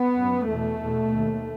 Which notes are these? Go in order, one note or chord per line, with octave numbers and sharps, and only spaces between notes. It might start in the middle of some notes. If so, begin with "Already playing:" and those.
Already playing: B3
F#2
E2 B2 A3
E2 B2
D#2